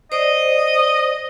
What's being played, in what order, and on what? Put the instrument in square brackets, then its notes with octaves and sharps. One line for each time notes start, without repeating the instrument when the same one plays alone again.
[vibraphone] C5 D5 [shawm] D#5